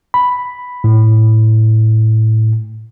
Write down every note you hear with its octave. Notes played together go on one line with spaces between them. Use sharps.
B5
A2